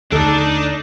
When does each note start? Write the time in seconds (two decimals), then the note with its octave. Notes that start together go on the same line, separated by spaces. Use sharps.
0.12 D#2 D3 A3 D4 D#4 A4 D5